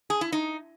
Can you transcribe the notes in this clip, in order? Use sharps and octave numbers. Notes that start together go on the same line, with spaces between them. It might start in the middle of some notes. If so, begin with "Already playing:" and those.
G#4
E4
D#4